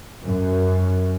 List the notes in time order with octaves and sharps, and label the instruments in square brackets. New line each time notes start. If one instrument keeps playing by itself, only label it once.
[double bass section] F#2